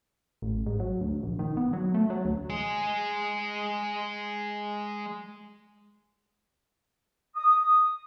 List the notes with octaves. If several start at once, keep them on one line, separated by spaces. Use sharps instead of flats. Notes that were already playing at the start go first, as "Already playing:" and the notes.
A1
G#2
F#3
D2
A#1
D#3
B3
F#3
A3
F#3
D2
G#3 G#4
D#6